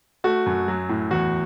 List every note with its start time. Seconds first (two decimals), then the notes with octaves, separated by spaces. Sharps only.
0.24 A3 F#4
0.46 F#2
0.68 F#3
0.89 A2
1.11 E2 F#4